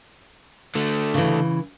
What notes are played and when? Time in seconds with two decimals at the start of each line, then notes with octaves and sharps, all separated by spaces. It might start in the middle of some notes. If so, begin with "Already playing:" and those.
0.75 D3 A3
1.14 C#3 E3